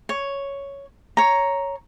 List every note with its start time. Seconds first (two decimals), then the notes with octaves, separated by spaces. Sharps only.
0.09 C#5
1.17 C#5 A#5